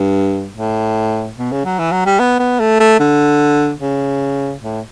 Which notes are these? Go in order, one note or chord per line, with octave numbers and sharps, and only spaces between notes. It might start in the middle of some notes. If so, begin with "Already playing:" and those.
Already playing: G2
A2
B2
C#3
F#3
E3
F#3
G3
B3
B3
A3
A3
D3
C#3
A2